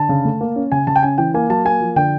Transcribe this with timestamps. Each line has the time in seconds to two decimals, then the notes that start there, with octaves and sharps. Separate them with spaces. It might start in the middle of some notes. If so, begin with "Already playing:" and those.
Already playing: D3 A5
0.09 C#3
0.25 A3
0.41 A#3
0.56 C#4
0.72 C#3 G#5
0.87 C#3 A5
0.96 G5
1.03 C#4 G#5
1.18 E3 G5
1.34 A#3 G#5
1.50 F#3 A5
1.65 A#3 G#5
1.81 F3
1.96 D3 G5